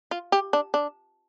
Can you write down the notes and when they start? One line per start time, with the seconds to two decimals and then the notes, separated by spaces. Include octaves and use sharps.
0.11 F4
0.32 G4
0.53 D4
0.74 D4